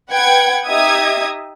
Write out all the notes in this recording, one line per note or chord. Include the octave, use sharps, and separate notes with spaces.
B4 F#5 G5 G#6
D#4 G4 E5 D#6 G#6